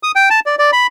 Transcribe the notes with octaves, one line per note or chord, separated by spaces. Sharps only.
D#6
G5
A5
D5
D5
B5